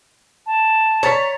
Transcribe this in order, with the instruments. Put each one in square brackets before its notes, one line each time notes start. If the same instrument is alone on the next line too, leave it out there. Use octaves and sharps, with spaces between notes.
[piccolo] A5
[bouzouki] C#5 [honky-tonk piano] A#5 A6 B6